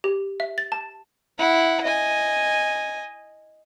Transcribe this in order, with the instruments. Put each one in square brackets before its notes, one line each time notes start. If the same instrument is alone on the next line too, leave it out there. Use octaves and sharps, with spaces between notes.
[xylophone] G4
E5
A6
A5
[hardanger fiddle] E4 F#5
D#5 G#5